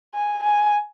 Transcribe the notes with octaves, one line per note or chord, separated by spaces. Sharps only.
G#5
G#5